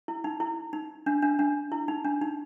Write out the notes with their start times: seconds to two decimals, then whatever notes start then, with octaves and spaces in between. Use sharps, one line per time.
0.08 E4
0.24 D#4
0.40 E4
0.73 D#4
1.06 D4
1.22 D4
1.39 D4
1.72 E4
1.88 D#4
2.05 D4
2.21 D#4